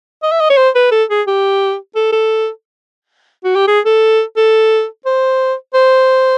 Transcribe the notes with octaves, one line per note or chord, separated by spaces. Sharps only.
D#5
E5
D#5
C#5
C5
B4
A4
G#4
G4
A4
A4
F#4
G4
G#4
A4
A4
C5
C5